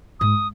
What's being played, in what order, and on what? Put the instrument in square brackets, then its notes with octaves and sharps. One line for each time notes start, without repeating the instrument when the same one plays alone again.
[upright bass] G#2 [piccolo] D#6